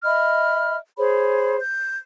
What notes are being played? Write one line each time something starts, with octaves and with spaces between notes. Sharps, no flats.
D#5 E5 B5 F6
G#4 C5 C#5 B5
G6